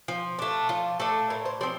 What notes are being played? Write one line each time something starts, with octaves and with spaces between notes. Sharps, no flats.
F3
A3 D4
F3 F4
A3 D4 A4
A2 A#4
C5
F3 C4 D5